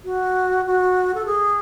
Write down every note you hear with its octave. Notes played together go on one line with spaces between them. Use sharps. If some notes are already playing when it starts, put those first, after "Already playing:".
F#4
F#4
A4
G#4